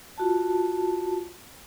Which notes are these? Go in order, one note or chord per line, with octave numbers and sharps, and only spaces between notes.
F4 F#4 A5